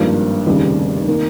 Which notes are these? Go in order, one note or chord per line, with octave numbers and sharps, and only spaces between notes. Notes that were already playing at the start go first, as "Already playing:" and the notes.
Already playing: G#1 G2 F3 A#3
F1 D#2 C#3 G3
D#3 A#3